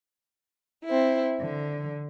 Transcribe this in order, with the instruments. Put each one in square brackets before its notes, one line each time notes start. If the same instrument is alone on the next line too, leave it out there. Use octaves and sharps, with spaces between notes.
[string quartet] C4 E4
D3